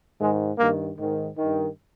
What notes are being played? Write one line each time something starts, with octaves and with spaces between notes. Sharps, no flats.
G#2 D#3 G#3
G2 D#3 A#3
G#2 D#3
G2 D#3